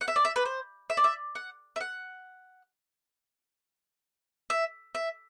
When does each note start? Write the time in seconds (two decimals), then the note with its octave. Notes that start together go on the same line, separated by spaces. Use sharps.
0.01 F#5
0.08 E5
0.16 D5
0.25 E5
0.36 B4
0.45 C5
0.90 E5
0.97 D5
1.04 E5
1.35 F#5
1.76 E5
1.81 F#5
4.50 E5
4.95 E5